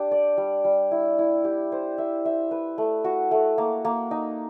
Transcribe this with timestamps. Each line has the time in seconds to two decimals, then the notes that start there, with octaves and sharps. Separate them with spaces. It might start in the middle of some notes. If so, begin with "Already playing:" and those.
Already playing: D4 G4
0.11 D5
0.37 G3
0.65 G3
0.91 E4
1.19 E4
1.45 G4
1.72 C5
1.98 E5
2.25 E5
2.51 B4
2.78 A3
3.04 F#4
3.31 A3
3.58 A#3
3.85 A#3
4.11 D#4